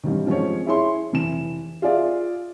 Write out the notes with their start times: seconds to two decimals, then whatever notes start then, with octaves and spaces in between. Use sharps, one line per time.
0.03 A1 G2 C3 D#3
0.27 F3 G#3 C4 C#4 C#5
0.66 E4 G#4 C#5 C6
1.12 F1 E3 E7
1.82 F4 G#4 D5 E5